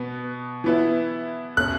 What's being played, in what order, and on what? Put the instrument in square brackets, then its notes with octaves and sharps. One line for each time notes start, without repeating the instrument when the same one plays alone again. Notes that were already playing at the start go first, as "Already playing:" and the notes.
Already playing: [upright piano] B2 B3
E3 B3 E4
[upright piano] B2 A3 C#4 [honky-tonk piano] F#6